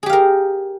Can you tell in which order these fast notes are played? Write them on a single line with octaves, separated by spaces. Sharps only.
G#4 G4 F5 A#4